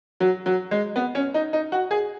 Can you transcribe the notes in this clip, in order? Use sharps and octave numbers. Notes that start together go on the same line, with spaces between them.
F#3
F#3
G#3
B3
C#4
D#4
D#4
F#4
G#4